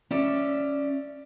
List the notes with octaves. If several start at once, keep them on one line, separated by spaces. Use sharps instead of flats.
C#4 D5 E5